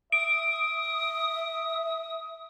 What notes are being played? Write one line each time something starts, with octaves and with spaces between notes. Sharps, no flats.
E5 D#6 D7